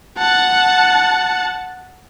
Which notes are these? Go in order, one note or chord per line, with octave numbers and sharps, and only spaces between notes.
F#5 A5